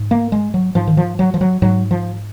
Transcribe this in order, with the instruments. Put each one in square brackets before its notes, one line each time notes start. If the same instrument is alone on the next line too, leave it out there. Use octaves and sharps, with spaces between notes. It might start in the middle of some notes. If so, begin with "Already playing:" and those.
Already playing: [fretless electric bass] G#2
A#3
G#3
F#3
G#2 F3
D#3
F3
F#3
F3
F#3
G#2 F#3
F3